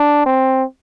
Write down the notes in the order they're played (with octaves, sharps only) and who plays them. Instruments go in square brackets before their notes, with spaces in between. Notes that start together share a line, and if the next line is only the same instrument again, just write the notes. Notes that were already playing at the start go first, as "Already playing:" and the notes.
Already playing: [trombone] D4
C4